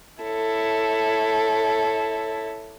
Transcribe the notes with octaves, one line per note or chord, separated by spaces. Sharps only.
E4 A4 C#5